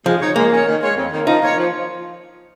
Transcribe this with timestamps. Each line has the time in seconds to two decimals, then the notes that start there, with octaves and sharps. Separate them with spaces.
0.06 F3 G#3
0.21 D#4 C#5
0.36 G#3 A#3
0.51 C#4 G#4 C#5
0.67 D#3
0.82 G#3 F4 C#5
0.97 F2
1.12 D#3 A#3
1.27 F3 D#4
1.42 A#3 F4 C#5
1.58 F3